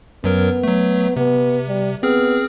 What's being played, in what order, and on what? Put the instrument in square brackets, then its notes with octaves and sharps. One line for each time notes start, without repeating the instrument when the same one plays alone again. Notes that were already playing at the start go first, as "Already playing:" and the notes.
[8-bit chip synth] F#2 F#3 A#4 [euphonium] B3
[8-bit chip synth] F#3 A3
[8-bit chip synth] C3 [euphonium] B3
[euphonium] G3
[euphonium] B3 [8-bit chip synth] C4 G#4 F6